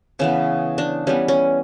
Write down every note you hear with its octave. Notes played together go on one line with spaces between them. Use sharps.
C#3 E3 B3 C#4
D4
E3 G3 B3 C#4
C#4